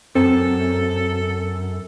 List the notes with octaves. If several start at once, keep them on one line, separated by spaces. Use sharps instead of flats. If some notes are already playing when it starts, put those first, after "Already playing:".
F#2 C4 A4